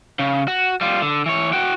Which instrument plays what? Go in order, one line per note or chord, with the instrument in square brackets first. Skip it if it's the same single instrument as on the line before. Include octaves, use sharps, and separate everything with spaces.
[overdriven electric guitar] C#3
F#4
G3 F4
D3
E3 C#5
F#4 G5